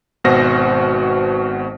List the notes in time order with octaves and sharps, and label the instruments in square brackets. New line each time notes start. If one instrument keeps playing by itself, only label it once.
[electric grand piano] G#1 B2 F#4 C5 A#6